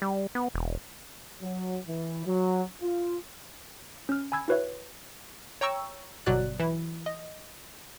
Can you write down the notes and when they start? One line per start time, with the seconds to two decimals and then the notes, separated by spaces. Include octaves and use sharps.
0.02 G3
0.35 B3
0.54 E1
1.42 F#3
1.86 E3
2.25 F#3
2.82 F4
4.09 C#4 F6
4.32 G#5 B5 E6 G#6
4.48 E4 F#4 B4 C#5 E5
5.61 C#5 G5 A#5 C#6 E6
6.26 G1 B2 F#3 F#4 D5 F#6
6.59 E3 E4
7.06 D#5